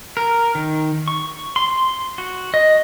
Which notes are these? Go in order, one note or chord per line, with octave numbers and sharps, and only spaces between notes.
A#4
D#3
C#6
C6
F#4
D#5